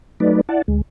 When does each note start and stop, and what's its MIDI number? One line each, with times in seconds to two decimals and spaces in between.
0.20 0.41 54
0.20 0.41 57
0.20 0.41 63
0.20 0.41 71
0.20 0.41 74
0.49 0.62 64
0.49 0.62 74
0.49 0.62 78
0.49 0.62 81
0.68 0.81 38
0.68 0.81 56